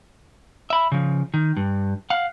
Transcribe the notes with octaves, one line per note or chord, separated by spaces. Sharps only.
E5 B5
C#3 F3
D#3
G2
F5 F#5